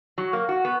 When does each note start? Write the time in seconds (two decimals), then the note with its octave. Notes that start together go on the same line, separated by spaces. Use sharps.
0.18 F#3
0.33 A#3
0.49 F#4
0.65 B3